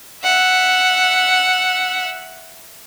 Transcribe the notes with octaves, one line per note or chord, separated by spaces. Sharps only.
E5 F#5